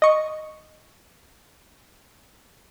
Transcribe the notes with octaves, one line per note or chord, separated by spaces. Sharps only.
D#5 C#6